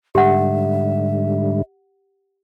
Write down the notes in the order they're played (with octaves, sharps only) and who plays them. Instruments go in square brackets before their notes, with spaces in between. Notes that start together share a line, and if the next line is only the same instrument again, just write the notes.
[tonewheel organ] G#2 D3 G3 [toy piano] G4 F#5 [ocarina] E5